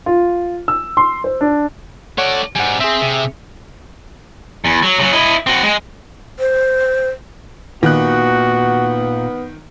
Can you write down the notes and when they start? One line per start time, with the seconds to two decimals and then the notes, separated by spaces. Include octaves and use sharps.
0.06 F4
0.68 E6
0.97 C6
1.24 C5
1.41 D4
2.18 A3 C#5 D5 F#5
2.56 G#2 G3 F#5 G#5
2.80 C4 G#4 E5
3.02 C3
4.65 E2
4.83 F#3
4.99 C#3 F#3
5.13 E4 D#5
5.47 C4 F#4
5.63 G#3
6.39 C5
7.83 A#2 D#3 B3 F#4 F#6